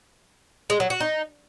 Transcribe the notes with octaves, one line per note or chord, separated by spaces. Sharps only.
G#3
F#3
F#4
D#4